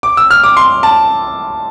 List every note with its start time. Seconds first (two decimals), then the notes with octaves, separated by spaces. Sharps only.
0.03 D6
0.17 E6
0.31 F6
0.44 D6
0.57 C6
0.83 A5